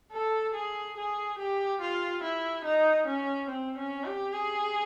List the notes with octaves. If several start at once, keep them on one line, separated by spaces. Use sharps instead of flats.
A4
G#4
G#4
G4
F4
E4
D#4
C#4
C4
C#4
G4
G#4